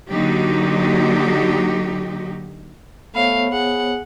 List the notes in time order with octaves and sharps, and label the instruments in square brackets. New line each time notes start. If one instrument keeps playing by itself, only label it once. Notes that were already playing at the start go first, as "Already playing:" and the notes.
[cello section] D3 F#3 A#3 D#4 F#4 G4
[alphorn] A3 [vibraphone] B3 C5 C#5 [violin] F5
[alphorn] G#4 [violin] F#5